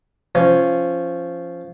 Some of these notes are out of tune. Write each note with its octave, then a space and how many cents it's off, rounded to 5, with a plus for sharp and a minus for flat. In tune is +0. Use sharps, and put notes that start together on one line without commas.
F3 -10 C#4 -5